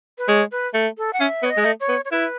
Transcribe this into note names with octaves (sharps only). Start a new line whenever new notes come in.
B4
G#3 C#5
B4
A3
A4
F#5
C#4 E5
B3 C#5
D#5
G#3
A3
C#5
B3
C#5
E4 B4